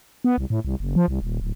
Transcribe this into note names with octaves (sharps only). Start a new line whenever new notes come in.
B3
C2
A2
C2
F#1
F3
C2
D#1
D1